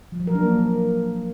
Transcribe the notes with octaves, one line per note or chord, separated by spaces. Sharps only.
F3
F#3
A#4
D4
A#3